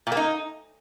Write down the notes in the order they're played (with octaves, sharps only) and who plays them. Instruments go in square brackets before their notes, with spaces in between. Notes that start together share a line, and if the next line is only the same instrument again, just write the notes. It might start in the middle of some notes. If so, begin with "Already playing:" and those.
[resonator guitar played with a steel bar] A#2
A#3
D#4